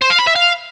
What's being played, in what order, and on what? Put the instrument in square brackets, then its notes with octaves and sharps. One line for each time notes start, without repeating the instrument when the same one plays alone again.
[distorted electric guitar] C5
F5
B5
E5
F5